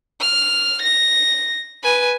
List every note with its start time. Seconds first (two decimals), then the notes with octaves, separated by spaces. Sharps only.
0.21 F6
0.82 A#6
1.83 B4 G#5